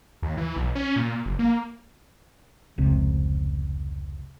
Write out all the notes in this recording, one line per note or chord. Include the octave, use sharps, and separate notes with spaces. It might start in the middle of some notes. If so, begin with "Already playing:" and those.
D#2
E3
B1
C#4
A#2
F#1
A#3
F1 C#2 C3